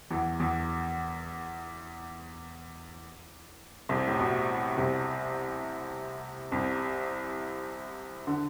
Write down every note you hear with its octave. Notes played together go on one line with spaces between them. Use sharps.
E2 E3
E2 E3
C2 C3
A2
B2
C2 C3
C2 C3
D3